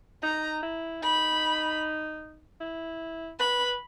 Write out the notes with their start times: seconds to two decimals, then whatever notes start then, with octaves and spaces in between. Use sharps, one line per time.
0.23 D#4 A#5
0.63 E4
1.02 D#4 B5
2.61 E4
3.39 B4 B5